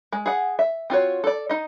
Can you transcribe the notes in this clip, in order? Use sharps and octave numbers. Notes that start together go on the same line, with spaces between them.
G#3
G#4 F#5
E5
C4 F4 F#4 C#5
A4 D5
D#4 D#5